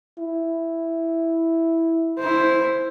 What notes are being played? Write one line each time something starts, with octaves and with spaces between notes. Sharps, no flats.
E4
E4 C5